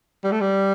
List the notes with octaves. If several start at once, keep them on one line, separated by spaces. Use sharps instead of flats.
G3
A3
G3